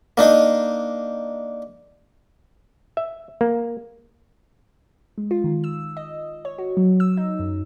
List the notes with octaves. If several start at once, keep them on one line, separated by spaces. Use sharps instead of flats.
A#3 D4 D#4
E5
A#3
G#3
F4
D#3
E6
D#5
C#5
F#4
F#3
E6
D#4
F#2